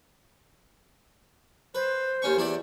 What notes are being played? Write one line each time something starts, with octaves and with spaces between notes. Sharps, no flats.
B4 C5
D#2 C#4 C#6
E2 E4 D5